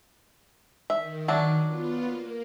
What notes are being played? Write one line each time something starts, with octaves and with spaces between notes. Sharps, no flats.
D#3 E5
F#3 D4 E5
B3 F4
A#3